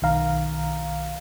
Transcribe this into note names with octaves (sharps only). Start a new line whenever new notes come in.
B1 D#3 F5 A#5